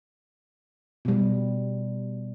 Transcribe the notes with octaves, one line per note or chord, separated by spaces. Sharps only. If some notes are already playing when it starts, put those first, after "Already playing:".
B2 G3